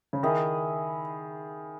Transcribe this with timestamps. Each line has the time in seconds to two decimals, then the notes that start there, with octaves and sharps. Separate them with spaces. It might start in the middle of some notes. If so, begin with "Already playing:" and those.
0.13 C#3
0.23 D#3 E4 G#4 D#5